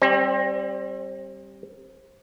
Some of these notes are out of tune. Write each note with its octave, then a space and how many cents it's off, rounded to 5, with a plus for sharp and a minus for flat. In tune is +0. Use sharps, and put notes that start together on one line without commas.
G3 +0 C4 +35 C5 +0